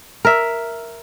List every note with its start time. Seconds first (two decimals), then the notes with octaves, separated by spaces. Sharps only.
0.25 A#4 E5